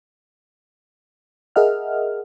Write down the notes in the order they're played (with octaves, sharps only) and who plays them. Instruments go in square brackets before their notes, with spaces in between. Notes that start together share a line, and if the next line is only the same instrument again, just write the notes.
[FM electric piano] G#4 A#4 D#5 E5 F#5 F6